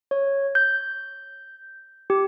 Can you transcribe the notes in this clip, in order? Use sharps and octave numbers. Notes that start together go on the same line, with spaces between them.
C#5
G6
G4